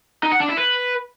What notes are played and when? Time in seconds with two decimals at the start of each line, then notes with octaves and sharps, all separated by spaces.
0.23 D#4
0.32 F#5
0.40 D4
0.49 E4
0.57 B4